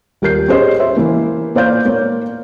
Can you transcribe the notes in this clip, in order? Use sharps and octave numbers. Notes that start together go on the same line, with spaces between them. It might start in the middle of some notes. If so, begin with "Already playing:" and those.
D#1 G4 A#4 G6 C7
C#4 G4 G#4 C5 C#5 D#5
C5 E5
E3 A#3
A#2 C5 D5 F5 G6
A#3 C#5